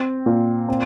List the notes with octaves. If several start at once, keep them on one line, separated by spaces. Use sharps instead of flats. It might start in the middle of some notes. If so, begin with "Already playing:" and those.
Already playing: C4
A#2
C4